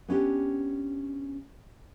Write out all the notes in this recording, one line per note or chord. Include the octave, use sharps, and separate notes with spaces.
B3 C#4 D4 G4